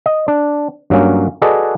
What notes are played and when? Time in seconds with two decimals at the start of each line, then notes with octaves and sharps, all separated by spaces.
0.06 D#5
0.28 D4
0.90 G2 F#3 A#3 C#4
1.42 F#4 G#4 A4 B4 D5 D#5